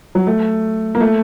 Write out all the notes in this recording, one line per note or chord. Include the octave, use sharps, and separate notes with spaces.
F#3
A3
A#3
A3